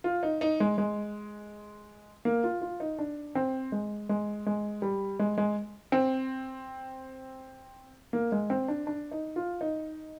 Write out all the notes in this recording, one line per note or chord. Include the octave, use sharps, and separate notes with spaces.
F4
D#4
D#4
G#3
G#3
A#3
F4
F4
D#4
D4
C4
G#3
G#3
G#3
G3
G#3
G#3
C4
A#3
G#3
C4
D4
D4
D#4
F4
D#4